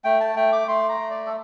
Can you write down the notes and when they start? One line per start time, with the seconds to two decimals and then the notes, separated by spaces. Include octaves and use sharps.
0.04 A3 G5
0.20 A5
0.36 A3 G5
0.52 D6
0.68 A3 C6
0.89 A#5
1.00 A3
1.10 D5
1.27 A4